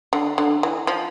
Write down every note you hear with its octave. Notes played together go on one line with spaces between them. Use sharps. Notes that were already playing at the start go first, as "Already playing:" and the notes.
D3
D3
E3
F3